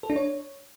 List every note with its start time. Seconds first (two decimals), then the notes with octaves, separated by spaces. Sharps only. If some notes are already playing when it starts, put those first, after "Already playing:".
0.03 A4
0.10 D4
0.16 C#5